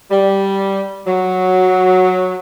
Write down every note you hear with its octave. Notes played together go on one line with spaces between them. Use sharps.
G3
F#3